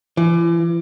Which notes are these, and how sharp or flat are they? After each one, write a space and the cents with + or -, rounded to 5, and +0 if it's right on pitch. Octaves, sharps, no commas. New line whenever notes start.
E3 +40